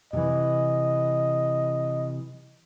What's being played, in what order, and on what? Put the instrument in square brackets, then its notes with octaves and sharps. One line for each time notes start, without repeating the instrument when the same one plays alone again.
[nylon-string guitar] C3 E3 [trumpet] D#5